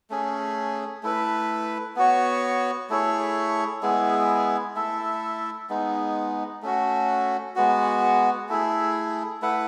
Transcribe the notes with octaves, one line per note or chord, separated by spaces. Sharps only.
A3 C#4 G#4
A3 E4 B4
B3 F#4 C#5
A3 E4 G#4 C#5
G#3 B3 E4 G#4
A3 E4 A4 E5
G#3 B3 D#4
A3 C#4 F#4
G#3 B3 F#4
A3 E4 G#4
A3 E4 B4 F#5